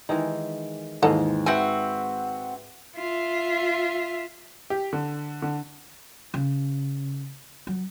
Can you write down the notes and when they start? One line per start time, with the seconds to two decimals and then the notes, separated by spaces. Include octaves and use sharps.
0.09 D#3 E3 G#3
1.02 D#2 G#2 E3 A4 D#5 F5 F#5
1.46 C4 F#4 B4 E5 F#5 G#5
2.96 F4 E5
4.70 G4
4.93 D3
5.42 D3
6.34 C#3
7.67 F#3